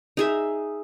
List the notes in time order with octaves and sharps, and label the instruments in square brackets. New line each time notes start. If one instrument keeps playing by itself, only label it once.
[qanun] D#4 G#4 E5